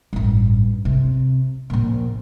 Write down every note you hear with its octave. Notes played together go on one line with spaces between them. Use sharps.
A1 G2
C3
A#1 A#2